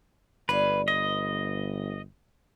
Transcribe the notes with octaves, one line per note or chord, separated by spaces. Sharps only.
G1 B4 C#5 D5 F5
B4 D#5